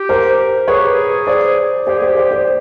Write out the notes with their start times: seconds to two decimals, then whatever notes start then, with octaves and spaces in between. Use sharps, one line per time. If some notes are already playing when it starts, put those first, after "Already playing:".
Already playing: G4
0.09 A#4 C5
0.68 G#4 B4 C#5
0.79 G4
0.89 G#4
1.27 C5 D5
1.86 G4 C5 D5
1.98 G#4 C5 D5
2.09 G4
2.17 C5 D5
2.31 C5 D5